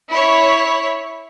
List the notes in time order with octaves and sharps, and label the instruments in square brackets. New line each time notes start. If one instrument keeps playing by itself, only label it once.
[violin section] E4 C#5 B6